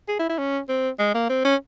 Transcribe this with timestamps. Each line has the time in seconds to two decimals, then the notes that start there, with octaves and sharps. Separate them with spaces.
0.08 G#4
0.19 E4
0.29 E4
0.38 C#4
0.69 C4
0.99 G#3
1.14 A#3
1.30 C4
1.45 C#4